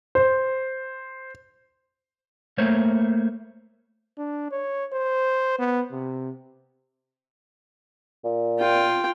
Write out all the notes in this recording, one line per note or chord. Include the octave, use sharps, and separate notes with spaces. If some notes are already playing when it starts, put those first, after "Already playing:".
C5
A3 A#3 C5 C#5
D4
C#5
C5
B3
C3
A#2
F4 G5